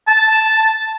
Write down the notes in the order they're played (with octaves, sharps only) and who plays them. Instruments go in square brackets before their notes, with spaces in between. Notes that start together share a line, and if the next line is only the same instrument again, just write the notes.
[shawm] A5